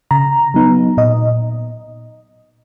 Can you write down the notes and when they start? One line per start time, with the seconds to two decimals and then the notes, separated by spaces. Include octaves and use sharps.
0.11 C#3 A#5
0.54 F#3 B3 D#4
0.97 A#2 D#5